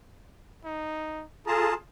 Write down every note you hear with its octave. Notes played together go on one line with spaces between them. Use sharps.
D#4
F4 G#4 A4 A5 A#5